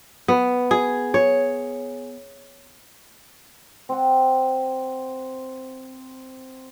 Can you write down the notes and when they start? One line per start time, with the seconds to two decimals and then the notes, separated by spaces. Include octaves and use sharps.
0.28 B3
0.71 G#4
1.14 C#5
3.89 C4 F#5